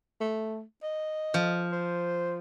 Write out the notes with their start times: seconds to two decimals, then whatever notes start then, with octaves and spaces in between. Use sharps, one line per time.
0.21 A3
0.83 D#5
1.34 F3
1.72 C5